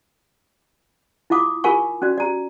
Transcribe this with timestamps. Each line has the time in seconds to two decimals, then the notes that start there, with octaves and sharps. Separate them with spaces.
1.30 E4 F4 F5 D6 D#6
1.64 F4 A#4 F5 G#5 C#6
2.02 C#4 F#4 D5
2.18 D5 A#5